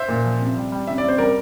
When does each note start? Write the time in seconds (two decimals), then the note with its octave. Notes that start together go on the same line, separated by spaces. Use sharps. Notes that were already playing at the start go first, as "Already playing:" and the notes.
Already playing: C5 E5
0.08 A#2
0.25 F3
0.40 C3
0.56 G3
0.72 G3
0.87 C3 E5
0.98 D5
1.04 C3 C5
1.18 G3 A#4 D5